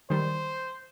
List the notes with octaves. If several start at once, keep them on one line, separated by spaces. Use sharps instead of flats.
D#3 G3 C5